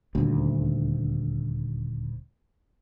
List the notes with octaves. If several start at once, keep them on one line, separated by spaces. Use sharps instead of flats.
D#1 D2